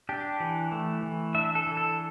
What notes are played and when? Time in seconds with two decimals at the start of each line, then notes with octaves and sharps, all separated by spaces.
0.09 D4 G4
0.40 E3
0.72 A3
1.03 E3
1.35 D4 E5
1.55 A4
1.67 E3
1.77 A4